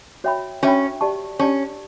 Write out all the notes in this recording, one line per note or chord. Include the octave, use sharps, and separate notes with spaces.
F#4 C#5 E5 G5 B5
C#4 F#4 C#5 E5 G5 B5
G4 D5 A5 C#6
C#4 G4 D5 A5 C#6